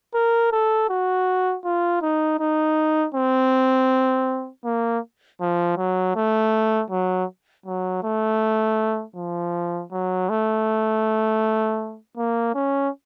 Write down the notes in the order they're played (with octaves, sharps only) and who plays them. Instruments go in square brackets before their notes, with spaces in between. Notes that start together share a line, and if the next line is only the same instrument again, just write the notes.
[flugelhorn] A#4
A4
F#4
F4
D#4
D#4
C4
A#3
F3
F#3
A3
F#3
F#3
A3
F3
F#3
A3
A#3
C#4